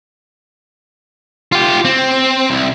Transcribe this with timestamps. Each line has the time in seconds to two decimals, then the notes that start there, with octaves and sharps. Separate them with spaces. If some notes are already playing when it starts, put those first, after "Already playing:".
1.52 F4 G4
1.85 C4
2.50 C2